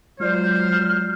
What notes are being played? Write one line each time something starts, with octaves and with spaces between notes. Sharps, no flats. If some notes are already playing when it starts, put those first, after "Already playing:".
F#3 G#3 F4 C5 D5 F6